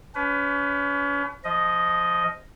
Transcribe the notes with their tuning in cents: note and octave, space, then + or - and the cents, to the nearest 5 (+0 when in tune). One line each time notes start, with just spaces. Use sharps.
C#4 +35 B4 +25
F3 -10 D#5 +0